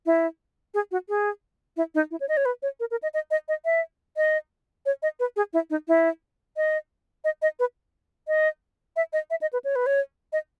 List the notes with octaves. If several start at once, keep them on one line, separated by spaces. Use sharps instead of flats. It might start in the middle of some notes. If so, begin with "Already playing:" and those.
E4
G#4
F#4
G#4
E4
D#4
E4
C#5
D#5
C#5
B4
C#5
A#4
A#4
D#5
D#5
D#5
D#5
E5
D#5
C#5
D#5
B4
G#4
E4
D#4
E4
D#5
D#5
D#5
B4
D#5
E5
D#5
E5
D#5
B4
C#5
B4
C#5
D#5